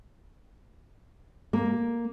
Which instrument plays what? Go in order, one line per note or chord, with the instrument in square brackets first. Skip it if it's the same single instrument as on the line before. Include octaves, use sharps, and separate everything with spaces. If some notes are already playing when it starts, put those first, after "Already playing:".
[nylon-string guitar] A#3